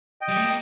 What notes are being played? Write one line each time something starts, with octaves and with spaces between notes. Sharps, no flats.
D#5 G5
G3
A3
A#3